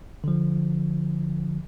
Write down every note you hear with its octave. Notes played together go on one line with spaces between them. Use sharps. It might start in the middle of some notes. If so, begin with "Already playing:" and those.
D3 F3